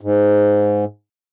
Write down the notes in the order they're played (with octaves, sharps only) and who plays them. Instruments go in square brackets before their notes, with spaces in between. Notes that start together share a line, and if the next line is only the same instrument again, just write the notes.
[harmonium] G#2